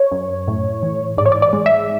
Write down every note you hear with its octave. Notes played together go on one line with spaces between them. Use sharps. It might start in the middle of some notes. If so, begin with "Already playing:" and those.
Already playing: C#5
F#2
A2
E3
G#2 D5
C#5
D5
D5
G#3
E5